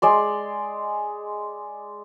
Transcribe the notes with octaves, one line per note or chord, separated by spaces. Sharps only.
G#3 D5 C6